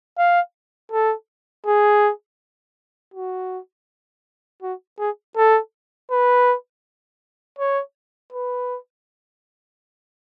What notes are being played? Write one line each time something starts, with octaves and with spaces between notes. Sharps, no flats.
F5
A4
G#4
F#4
F#4
G#4
A4
B4
C#5
B4